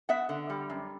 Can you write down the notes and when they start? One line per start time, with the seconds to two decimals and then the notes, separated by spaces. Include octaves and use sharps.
0.09 B3 E5 F#5
0.29 D3
0.50 G3
0.70 F#2